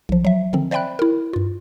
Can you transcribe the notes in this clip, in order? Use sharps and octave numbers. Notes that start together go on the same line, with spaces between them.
B1 F3
F#3 E5
D3 D#3 F3 C4
C5 D5 E5 G5 B5 F#6
E4 A#4
G2 F4